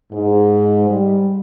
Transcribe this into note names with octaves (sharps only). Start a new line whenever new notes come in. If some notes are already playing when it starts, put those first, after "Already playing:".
G#2
G3